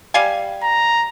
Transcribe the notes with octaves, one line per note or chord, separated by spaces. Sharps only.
G3 F5 G#5
A#5